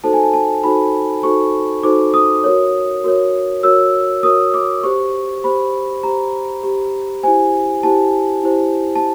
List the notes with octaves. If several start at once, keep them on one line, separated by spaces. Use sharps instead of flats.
D#4 F#4 A4 C5 A5
G#5
A5
A5
D#4 F#4 A4 C5 B5
D#4 F#4 A4 C5 C#6
D#4 F#4 A4 C5 D6
D#6
F#4 A#4 C#5
F#4 A#4 C#5
F#4 A#4 C#5 E6
F#4 A#4 C#5 D#6
D6
G4 C5 C#6
G4 C5 B5
G4 C5 A#5
G4 C5
E4 G4 C5 G#5
E4 G4 C5 A5
E4 G4 C5
A5